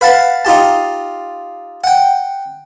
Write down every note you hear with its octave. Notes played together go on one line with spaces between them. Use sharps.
B4 F5 F#5 A5
D#4 F4 G4 A5
F#5 G5